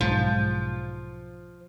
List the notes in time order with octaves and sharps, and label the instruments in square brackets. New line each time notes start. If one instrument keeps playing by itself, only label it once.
[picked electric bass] B1 G#2 [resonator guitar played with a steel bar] F3